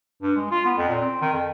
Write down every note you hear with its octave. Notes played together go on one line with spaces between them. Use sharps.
G2
G#3
F4
B3
F2
A#2
C4
D#3
F2